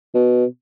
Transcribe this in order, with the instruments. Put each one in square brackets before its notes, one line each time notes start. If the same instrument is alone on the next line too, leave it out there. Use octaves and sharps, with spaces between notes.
[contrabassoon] B2